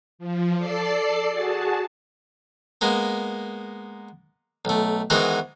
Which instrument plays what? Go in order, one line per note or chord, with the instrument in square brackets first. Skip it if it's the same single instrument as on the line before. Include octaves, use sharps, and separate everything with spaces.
[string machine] F3
A4 D5 C7
F#4 G#4 A5
[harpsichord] G#3 A#3 B3
B1 A3
G#2 D#3 E3 G#3 B3 F#4